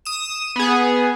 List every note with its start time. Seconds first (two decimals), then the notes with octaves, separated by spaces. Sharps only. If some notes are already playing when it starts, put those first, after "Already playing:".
0.05 D#6 E7
0.56 B3 G#4